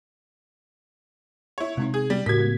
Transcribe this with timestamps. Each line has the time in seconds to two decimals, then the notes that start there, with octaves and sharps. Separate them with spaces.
1.58 E4 C#5
1.77 C3 G#3 C4 D#4
1.94 G#4
2.10 G3
2.26 A2 C#3 F#4 G4 A#4 G#6 B6
2.38 G#3 B3